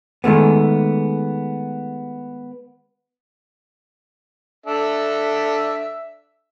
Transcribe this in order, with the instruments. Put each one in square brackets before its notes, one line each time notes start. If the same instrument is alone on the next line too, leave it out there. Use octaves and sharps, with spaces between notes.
[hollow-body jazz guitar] D#3 G#3 A3 B3
[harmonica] D4 A4 E5